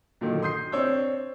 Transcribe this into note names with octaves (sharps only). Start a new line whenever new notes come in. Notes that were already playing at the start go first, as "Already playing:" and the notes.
A#2 D3 D#3 F#3
C6 D#6 G6 C7
C4 D4 C#5 E6 G6